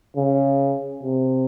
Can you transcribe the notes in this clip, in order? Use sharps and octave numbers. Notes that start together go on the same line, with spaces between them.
C#3
C3